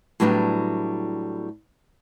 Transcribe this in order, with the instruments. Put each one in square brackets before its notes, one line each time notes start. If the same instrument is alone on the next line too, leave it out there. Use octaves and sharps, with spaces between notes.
[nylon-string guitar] A2 F#3 G3 B3 C4 D4